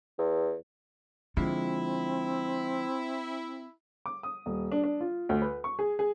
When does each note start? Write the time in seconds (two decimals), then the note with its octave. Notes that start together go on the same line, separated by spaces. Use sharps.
0.18 E2
1.37 D3 F3 G#3 C4 E4 F4
4.06 D6
4.23 D#6
4.46 D#1
4.72 D4
4.84 D4
5.00 F4
5.29 D2
5.42 B4
5.64 C#6
5.79 G#4
5.99 G#4